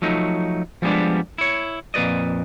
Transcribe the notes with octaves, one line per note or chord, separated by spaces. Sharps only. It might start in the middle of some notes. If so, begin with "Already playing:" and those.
F3 F#3 A3 D#4
F3 G3 G#3 A#3 B3 D4
E4 C#5
F2 A#2 B4 D5 D#5